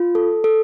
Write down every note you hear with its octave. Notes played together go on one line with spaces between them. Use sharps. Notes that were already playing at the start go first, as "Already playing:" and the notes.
Already playing: F4
A4
A4